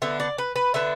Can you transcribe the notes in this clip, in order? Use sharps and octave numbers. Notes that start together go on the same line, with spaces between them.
D3 B3 D4 E5
D5
B4
B4
D3 B3 D4 E5